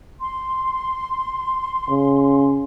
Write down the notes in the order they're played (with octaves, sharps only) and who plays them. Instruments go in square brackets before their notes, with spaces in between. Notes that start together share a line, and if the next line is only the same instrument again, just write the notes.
[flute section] C6
[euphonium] C#3